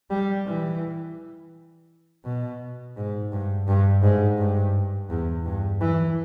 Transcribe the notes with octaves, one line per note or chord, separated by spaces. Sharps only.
G3
E3
B2
G#2
G2
G2
G#2
G2
E2
G2
E3